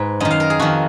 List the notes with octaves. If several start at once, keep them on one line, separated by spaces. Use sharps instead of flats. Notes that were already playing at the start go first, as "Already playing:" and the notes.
Already playing: G#2 B4
F#2 D#3 D#5
F5
A#4
G#4
F2 D#3 F#4